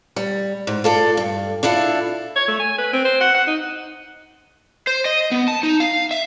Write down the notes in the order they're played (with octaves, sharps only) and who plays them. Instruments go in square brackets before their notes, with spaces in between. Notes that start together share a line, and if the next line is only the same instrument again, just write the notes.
[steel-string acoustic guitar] G3
G#2
F4 A4 D5
G2
D4 E4 F4 A4
[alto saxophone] C#5
A3
G#5
B4
C4
C5
F#5
F#5
D#4
[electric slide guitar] C5
D#5
B3
A5
D#4
F5
E5